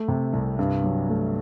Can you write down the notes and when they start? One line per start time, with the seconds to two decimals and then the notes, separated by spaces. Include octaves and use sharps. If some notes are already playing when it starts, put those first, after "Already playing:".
Already playing: A3
0.08 C3
0.33 C2
0.59 G2
0.84 F#3
1.09 A3